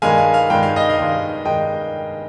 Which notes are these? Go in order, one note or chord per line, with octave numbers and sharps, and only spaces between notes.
G2 D#3 G#3 F5 G#5
F5
F5
G2 D#3 G#3 G5
F5
D#5
F5
G2 D#3 G#3
G2 D#3 G#3 D#5 G5